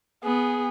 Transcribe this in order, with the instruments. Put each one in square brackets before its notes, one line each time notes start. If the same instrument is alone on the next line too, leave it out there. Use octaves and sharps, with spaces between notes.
[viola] B3 [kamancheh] G#4